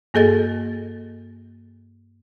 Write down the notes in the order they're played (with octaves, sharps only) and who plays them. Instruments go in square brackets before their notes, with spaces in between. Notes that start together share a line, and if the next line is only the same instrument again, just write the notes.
[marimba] G2 A#3 G#4 A4 D#5 A6